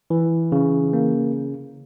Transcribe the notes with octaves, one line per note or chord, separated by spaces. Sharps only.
E3
C#3
A#3